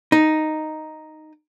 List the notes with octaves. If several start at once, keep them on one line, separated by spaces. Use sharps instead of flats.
D#4